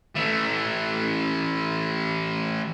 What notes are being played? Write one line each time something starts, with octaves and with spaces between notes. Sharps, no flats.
E3 A3